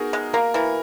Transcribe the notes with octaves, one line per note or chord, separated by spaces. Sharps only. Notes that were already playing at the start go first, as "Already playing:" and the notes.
Already playing: B3 D#4 F#4 G#4 A#4
G#3
A#3 A#4
E3 A#4